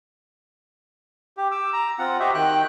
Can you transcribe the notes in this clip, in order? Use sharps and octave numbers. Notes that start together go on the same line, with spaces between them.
G4
D6 E6
A#5
C4 F4 F#5
F#4 G4 C5 D#5 E5
D#3 G5 F#6